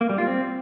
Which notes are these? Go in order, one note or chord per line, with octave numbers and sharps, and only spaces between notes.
A#3
G3
F4
C4